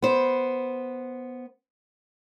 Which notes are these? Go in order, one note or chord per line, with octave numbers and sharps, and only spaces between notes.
B3 C5